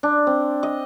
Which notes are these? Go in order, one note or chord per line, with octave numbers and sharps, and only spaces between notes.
D4
C4
D#5